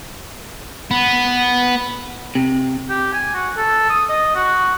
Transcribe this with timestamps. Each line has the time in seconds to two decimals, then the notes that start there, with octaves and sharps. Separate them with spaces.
0.91 B3
2.35 C3
2.89 G4
3.13 G#5
3.34 F#4
3.56 A4
3.89 D#6
4.09 D#5
4.35 F#4